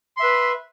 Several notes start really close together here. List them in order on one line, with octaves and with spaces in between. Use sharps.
C6 E5 B4